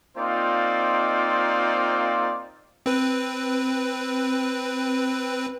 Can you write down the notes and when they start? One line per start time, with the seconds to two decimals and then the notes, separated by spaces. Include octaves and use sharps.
0.17 A#3 C4 D#4 F4 C5 D5
2.86 C4 B4